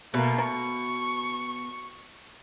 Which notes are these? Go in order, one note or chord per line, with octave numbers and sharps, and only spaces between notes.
B2 A3 A#3
C#6